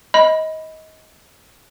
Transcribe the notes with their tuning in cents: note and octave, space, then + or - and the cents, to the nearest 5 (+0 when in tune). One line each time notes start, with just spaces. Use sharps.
D#5 +25 B5 +0